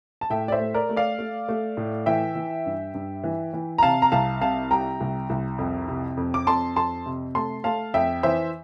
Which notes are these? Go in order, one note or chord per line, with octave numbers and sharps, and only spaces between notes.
A5
A2 E5 G5
D5
C5 E5
A3
A#4 D5
A3
D5 F5
A3
A3
A2
E3 E5 G5
E3
G2
G2
E3
E3
A#5
C3 F5 A5
A#5
C2 F5 A5
C3 F5 A5
G3 G5 A#5
C2
C2
F2
C3
F2
D6
F2 A5 C6
F2 A5 C6
C3
A3 A5 C6
A3 F5 A5
F2 E5 G5
E3 C5 E5